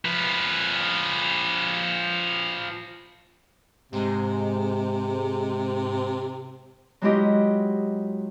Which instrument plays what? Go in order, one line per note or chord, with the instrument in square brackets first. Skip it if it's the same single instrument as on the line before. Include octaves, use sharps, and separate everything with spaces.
[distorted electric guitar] F3 B4
[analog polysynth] G#2 G#3 [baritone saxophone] C3
[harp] F#3 G#3 E4 F4 G4 D#5